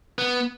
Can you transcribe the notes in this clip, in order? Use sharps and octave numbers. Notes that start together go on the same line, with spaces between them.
B3